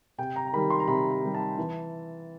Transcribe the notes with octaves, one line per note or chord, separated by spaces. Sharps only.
C3 G5
A#5
A#5
D#3 G3 B5
C6
A#5
C3 B5
A#5
D#3 G3
A5
E3